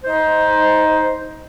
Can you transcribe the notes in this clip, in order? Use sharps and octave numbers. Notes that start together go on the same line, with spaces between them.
D#4 C5